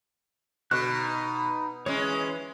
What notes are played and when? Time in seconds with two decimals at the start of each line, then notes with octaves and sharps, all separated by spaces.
0.71 B2 D3 C#6 F#6
0.89 D#4
1.86 E3 G#3 C#4 C#5